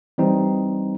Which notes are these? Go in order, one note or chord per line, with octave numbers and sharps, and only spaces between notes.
E3 G3 C4 D#4